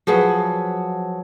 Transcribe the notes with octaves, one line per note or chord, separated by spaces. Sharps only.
F3 F#3 G#4 B4